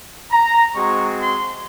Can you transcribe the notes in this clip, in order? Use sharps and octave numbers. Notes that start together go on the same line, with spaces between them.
A#5
G#3 C4 F#4 C#6
C6